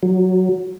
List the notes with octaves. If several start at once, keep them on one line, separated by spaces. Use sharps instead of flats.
F#3